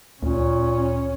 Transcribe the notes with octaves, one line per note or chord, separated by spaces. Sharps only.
D2 A#2 C#4